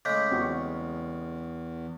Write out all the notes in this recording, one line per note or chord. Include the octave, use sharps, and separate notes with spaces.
C#3 G#3 A3 D6 G6 B6
E2 C4 F#4 G5 C#6